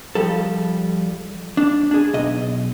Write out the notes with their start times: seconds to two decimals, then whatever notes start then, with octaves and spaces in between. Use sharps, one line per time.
0.15 F3 G3 A4
1.57 D4
1.91 D4 G#4
2.13 B1 D#5